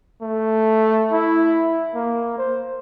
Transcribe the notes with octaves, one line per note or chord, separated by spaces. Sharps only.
A3
E4
A#3
C5